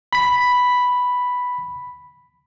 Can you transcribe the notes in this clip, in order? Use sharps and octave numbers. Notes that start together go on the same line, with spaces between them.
B5 B6